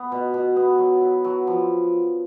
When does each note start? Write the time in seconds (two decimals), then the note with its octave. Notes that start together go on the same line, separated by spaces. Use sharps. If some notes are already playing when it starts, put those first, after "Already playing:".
Already playing: B3
0.12 B2
0.34 B2
0.56 B3
0.78 F#3
1.01 E4
1.24 F#3
1.47 F3